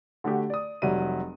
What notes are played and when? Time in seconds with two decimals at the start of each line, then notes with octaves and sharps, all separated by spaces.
0.24 D3 A3 F#4 G4
0.50 D5 D#6
0.82 F1 F#3 G3 D5 E5 D#7